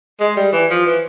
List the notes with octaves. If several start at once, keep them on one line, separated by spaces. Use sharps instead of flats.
G#3
G3
E3
F3
E3